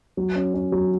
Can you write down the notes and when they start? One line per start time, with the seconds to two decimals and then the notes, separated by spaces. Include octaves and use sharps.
0.17 F#3
0.35 C#4
0.54 C#4
0.72 F#3